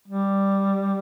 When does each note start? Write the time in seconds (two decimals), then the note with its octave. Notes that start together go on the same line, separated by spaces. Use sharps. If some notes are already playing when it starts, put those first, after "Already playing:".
0.08 G3